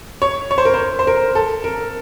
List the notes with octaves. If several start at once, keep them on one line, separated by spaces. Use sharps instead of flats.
C#5
C#5
C5
A#4
C5
C5
A#4
A4
A#4